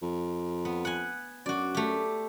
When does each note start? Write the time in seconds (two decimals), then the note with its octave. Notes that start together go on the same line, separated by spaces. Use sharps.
0.02 F2
0.65 B3
0.85 F#5 G#5
1.46 F#2 F#4 D5
1.75 A3 G4